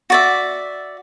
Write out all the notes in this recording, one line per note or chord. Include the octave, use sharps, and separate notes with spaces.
F#4 D5 E5